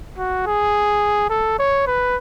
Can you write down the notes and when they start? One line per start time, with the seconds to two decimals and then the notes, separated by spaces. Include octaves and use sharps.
0.18 F#4
0.47 G#4
1.30 A4
1.59 C#5
1.87 B4